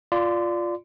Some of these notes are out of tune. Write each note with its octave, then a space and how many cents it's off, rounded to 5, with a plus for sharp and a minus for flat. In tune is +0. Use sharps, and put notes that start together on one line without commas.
F4 +0 D5 +0 C6 -30